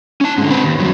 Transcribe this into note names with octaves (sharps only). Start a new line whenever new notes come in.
C#4 A5
G#2 D3
C4 B4
D#2
G2 F#3